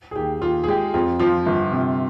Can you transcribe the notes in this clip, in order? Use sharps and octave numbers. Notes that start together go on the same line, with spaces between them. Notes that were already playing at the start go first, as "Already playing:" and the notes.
G#4
D#2 G4
D#2 F4
G#4
G#3 G4
F2 F4
F3 F4
G1
C3